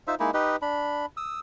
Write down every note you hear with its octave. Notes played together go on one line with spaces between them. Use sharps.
D#4 F4 C5 E5
G#3 A#3 D#4 E4
D#4 G4 B4 D#5
D4 B5
D#6 E6